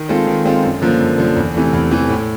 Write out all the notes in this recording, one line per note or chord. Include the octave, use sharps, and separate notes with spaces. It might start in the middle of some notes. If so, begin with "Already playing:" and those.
Already playing: D#3
G#3 C4 F4 A4
D#3
G#3 C4 F4 A4
F#2
D3 F3 A#3
F#2
D3 F3 A#3
E2
C3 E3 A3
E2
C3 E3 A3
A2